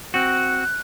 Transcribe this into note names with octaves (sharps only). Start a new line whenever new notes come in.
C4 F#4 F#6